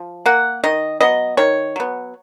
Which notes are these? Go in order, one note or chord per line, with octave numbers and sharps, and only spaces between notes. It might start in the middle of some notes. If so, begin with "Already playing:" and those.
Already playing: F3
A#3 F#5
D#3 D#5
F#3 B3 D#5
D#3 C#5
F#3 B3